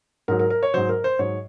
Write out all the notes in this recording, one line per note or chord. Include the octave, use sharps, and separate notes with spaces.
G#2 F#3 A#4
A#4
A#4
C#5
G#2 F#3 C5
A#4
C5
G#2 F#3 C#5